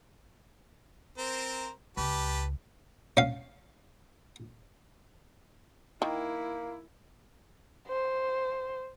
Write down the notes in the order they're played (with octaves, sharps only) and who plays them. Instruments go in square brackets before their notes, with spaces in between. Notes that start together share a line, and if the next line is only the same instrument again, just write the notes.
[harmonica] C4 A#4 C5
[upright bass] C#2 [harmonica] G4 B4 A5
[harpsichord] C#4 F5
[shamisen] D#3 [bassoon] A#3 [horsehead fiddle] E4
[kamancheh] C5